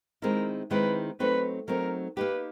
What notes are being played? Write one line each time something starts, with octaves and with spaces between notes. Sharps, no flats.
D#3 G#3 C4 E4 A#4
D#3 G#3 C4 E4 B4
F#3 A3 C4 D#4 B4
F#3 A3 C4 D#4 A#4
A#3 D#4 G4 B4